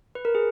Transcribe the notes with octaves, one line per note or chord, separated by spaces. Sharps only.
B4
A#4
G#4